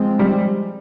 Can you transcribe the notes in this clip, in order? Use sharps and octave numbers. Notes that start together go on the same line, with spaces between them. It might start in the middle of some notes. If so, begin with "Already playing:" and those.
Already playing: F3 G#3 C4
G3